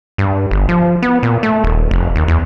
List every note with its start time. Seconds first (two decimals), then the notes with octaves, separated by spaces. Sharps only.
0.18 G2
0.51 G1
0.69 F3
1.02 B3
1.23 A#2
1.43 A3
1.64 D#1
1.91 F1
2.16 D#2
2.28 E2